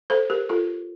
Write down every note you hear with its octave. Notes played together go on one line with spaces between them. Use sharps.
A4 C5
G4 A#4
F4 A4